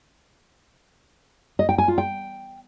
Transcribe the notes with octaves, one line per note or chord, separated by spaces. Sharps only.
D#5
G5
G#5
F4
G5